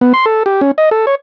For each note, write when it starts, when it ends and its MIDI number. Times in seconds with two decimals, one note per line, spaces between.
0.01 0.13 59
0.14 0.25 84
0.26 0.43 69
0.46 0.61 67
0.61 0.71 61
0.78 0.89 75
0.91 1.06 69
1.07 1.15 73